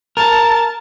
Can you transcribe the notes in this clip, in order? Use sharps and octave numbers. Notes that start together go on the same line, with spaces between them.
A#4 A5